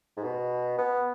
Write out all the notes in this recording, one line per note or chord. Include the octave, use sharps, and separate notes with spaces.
G#2
B2
B3